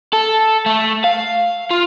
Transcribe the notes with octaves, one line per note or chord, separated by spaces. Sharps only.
A4
A3
F5
F4